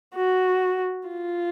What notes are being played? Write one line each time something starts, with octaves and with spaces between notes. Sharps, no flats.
F#4
F4